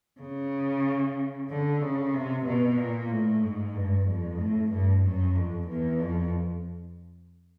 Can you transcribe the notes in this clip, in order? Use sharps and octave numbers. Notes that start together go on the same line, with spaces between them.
C#3
D3
C#3
C3
B2
A#2
A2
G#2
G2
F2
A2
G2
F#2
F2
E2
F2